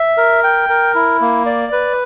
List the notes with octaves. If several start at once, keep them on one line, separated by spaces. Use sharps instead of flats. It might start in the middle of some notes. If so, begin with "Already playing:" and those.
Already playing: E5
A#4
G5
A#4
E4
A#3
D5
B4